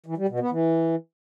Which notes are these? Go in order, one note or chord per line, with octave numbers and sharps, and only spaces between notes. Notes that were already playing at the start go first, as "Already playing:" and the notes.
E3
G3
B2
B3
E3